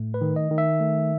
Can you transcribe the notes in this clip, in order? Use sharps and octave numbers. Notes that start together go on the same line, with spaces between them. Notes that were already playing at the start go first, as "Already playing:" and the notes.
Already playing: A2 A3
B4
D#3
D#5
D#3
E5
A3